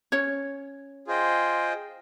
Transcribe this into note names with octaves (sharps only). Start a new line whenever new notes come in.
C#4 C#5
F4 G#4 C5 D#5 G5